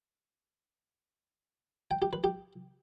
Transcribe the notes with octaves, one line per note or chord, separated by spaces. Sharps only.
G5
G4
B4
G4